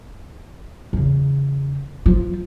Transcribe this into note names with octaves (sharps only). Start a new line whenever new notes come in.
E2 C#3
F3 F4